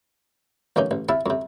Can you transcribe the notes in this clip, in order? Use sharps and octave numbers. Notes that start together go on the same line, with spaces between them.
A1 D#3 A#3 C#4 D#4
A1
C3 E4 E5 F5 A5
F2 C3